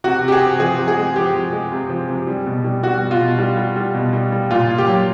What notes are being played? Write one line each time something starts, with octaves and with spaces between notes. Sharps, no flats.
C3 F#4
C3
G4
G#4
C3
F3 G#4
C3
G#4
G#3
F3 G4
C3
G#3
C3
F3
C3
G3
B2
G3
G3 F#4
B2
F4
B2
G3
G3
G3
B2
G3
G3
A#2 F4
A#2
G4
F#3